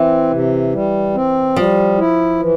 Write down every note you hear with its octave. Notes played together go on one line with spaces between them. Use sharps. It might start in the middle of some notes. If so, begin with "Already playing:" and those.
Already playing: E3 C4
C3
G3
C4
F3 G3
E4
E3